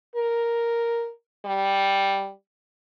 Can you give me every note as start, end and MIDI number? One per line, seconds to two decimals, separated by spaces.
0.16 1.11 70
1.45 2.30 55